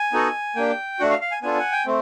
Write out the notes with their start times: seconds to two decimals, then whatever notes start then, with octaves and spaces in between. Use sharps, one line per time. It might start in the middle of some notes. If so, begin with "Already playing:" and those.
Already playing: G#5
0.13 B3 D#4 F#4 A4
0.56 A#3 D4 G4 G5
0.99 A3 D4 F#4 F#5
1.10 F5
1.21 F5
1.31 G#5
1.42 B3 D4 F4 A4 G#5
1.59 F#5
1.72 G5
1.86 A3 C4